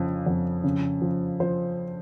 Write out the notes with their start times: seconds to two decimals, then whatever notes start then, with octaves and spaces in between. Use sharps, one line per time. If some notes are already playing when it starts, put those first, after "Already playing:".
Already playing: F2 C#3 F3
0.26 F2
0.64 C#3
1.02 F3
1.40 F3 C5